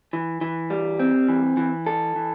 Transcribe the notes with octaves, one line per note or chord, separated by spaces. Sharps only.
E3
E3
G3
C4
E3
E3
A4
E3